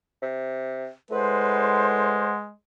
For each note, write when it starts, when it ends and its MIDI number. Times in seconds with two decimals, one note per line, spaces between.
0.22 0.88 48
1.11 2.31 45
1.11 2.53 56
1.11 2.43 71
1.11 2.35 72
1.11 2.35 78
1.11 2.35 84